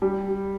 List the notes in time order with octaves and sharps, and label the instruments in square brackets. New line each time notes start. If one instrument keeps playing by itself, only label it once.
[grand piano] G3